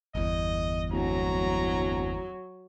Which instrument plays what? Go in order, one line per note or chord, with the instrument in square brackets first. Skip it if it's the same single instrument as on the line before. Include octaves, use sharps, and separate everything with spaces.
[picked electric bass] G1 E2 [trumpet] D#5
[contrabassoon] D1 [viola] F#3 [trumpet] A#5